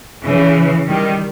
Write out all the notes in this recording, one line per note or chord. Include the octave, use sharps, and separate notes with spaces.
C#3 E3
D#3 G3